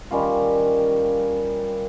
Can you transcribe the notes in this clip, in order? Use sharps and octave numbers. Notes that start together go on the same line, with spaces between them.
D#3 G3 C#4 F4